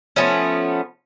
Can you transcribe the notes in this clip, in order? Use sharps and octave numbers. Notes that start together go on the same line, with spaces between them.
F3 A3 B3 C#4